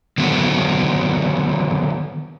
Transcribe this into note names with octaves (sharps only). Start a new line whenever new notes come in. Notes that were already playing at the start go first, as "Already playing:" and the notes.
D3 D#3 F#3 B3